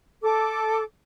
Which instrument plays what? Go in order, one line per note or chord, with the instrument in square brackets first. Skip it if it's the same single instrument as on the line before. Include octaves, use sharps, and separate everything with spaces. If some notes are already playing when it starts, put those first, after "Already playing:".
[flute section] A4 D6